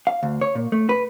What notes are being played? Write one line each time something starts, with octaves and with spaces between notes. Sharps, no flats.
F5
D2
C#5
A#2
A3
B4